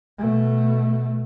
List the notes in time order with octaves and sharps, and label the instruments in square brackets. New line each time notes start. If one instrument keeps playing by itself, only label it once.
[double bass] B2 A3